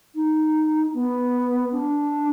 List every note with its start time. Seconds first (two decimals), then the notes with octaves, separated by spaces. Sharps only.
0.15 D#4
0.94 B3
1.72 D4